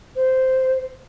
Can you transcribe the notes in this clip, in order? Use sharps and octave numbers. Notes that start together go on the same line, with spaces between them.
C5